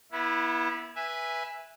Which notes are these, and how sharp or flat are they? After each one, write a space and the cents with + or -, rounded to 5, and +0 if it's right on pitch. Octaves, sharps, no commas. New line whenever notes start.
B3 -30 E4 +0
B4 -10 E5 +0 G#5 -10